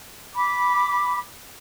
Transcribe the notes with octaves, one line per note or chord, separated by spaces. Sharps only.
B5 D6